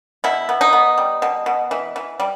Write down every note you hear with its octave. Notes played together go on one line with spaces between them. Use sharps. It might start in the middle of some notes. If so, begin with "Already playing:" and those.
B2 E4
B3
D#4
B3
G3
B2
B2
E3
E3
G3